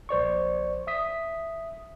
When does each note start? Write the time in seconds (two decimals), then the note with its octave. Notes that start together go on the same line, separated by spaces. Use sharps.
0.09 A#1 C5 D5 C#6
0.87 E5 D#6 B6